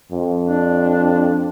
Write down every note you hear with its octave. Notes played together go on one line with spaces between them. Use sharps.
F2
D4